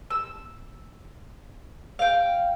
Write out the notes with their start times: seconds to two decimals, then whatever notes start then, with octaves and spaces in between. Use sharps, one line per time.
0.10 E6
1.99 F5 G5